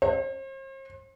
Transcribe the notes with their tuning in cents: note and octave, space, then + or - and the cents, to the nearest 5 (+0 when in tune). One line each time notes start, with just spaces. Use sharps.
C5 +45